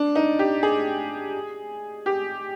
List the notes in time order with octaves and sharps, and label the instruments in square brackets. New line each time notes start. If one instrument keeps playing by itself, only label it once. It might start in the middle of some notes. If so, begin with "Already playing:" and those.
Already playing: [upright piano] D4
D#4
G4
G#4
G4